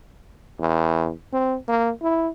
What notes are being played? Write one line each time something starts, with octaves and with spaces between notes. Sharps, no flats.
E2
C4
A#3
E4